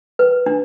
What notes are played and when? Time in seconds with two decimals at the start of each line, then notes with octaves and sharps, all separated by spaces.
0.19 B4
0.46 D4